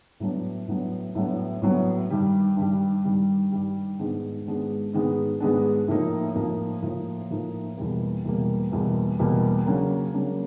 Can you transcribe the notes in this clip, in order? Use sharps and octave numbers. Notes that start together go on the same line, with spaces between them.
A2 F#3 B3 D4
A2 F#3 B3 D4
A2 F#3 B3 D4
A2 F#3 B3 D4
G2 D#3 G3
G2 D#3 G3
G2 D#3 G3
G2 D#3 G3
G#2 D#3 G#3 B3 D4
G#2 D#3 G#3 B3 D4
G#2 D#3 G#3 B3 D4
G#2 D#3 G#3 B3 D4
A2 F3 A#3 D#4
A2 F3 A#3 D#4
A2 F3 A#3 D#4
A2 F3 A#3 D#4
E2 B2 G3 A#3
E2 B2 G3 A#3
E2 B2 G3 A#3
E2 B2 G3 A#3
C#3 F#3 A#3 D4
C#3 F#3 A#3 D4